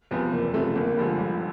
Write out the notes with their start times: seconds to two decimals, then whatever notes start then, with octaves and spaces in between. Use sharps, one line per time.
0.11 E2 C3 F3 B3
0.32 F#1 A#3
0.54 E2 C3 F3 A3
0.75 G1 A#3
0.97 G2 D3 F3 G#3
1.19 G1